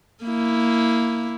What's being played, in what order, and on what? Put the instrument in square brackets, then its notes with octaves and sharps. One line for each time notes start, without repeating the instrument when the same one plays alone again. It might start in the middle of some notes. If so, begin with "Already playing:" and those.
[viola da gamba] A#3 E4